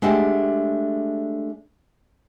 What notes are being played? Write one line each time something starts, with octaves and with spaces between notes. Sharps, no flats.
G#3 A3 D4 G4 E5 F#5